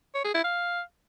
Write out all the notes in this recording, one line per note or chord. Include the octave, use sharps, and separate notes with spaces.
C#5
G#4
E4
F5